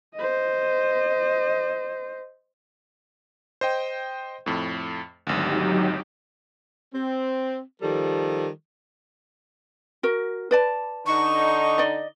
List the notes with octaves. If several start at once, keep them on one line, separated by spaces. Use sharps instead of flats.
C5 D#5
C5 D#5 G5
F2 A2
G#1 D2 F#3 D#4 G4
C4
D#3 F3 G3 A4
F#4 A#4
B4 D5 A5
D3 D#4 C#6
D5 D#5